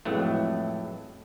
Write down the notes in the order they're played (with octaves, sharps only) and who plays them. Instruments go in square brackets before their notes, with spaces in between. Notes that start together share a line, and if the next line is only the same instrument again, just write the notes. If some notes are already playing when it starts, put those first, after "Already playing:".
[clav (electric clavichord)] F2 A2 E3 F#3 G#3 A3